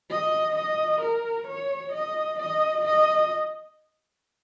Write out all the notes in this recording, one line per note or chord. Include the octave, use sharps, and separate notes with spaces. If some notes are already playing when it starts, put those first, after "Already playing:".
D#5
D#5
A#4
C#5
D#5
D#5
D#5